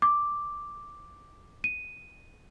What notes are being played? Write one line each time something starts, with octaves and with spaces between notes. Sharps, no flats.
D6
D#7